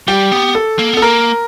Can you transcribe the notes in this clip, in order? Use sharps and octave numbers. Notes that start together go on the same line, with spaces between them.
G3 G4
B3
A4
A#3
B3 A4
A#3 A#4